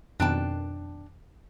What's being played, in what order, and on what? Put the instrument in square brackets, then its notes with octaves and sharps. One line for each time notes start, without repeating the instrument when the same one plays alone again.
[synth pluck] F2 B2 D#3 [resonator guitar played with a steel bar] D4 G5 A5